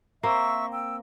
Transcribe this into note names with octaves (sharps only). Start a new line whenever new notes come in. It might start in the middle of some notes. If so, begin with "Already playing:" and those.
A#3 C4 E5 C#6 E6
G5 E6